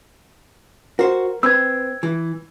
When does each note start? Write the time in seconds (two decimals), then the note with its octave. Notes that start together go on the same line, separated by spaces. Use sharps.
0.99 F#4 A#4 C5
1.43 C4 B4 E6 G#6
2.03 E3